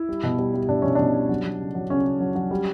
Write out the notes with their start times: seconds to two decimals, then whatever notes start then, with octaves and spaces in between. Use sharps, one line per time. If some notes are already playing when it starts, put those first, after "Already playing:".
Already playing: E4
0.09 G3
0.23 B2
0.39 G3
0.54 G3
0.69 B2 D4
0.82 B2 C#4
0.95 B2 D4
1.15 G3
1.29 F#3
1.45 F#3
1.60 C#3
1.75 F#3
1.90 C#3 C#4
2.05 C#3
2.20 F#3
2.35 F#3
2.51 G3